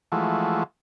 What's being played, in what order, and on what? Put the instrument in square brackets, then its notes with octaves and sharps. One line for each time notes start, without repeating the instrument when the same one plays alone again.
[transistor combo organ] E3 F3 G#3 A3 F#4